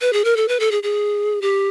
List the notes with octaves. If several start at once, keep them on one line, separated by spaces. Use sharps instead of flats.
B4
G#4
A#4
A4
B4
A4
G#4
G#4
G4